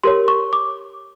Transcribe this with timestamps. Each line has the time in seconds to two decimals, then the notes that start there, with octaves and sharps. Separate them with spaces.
0.03 G4 A#4 C#5 C6
0.28 C#6
0.53 D6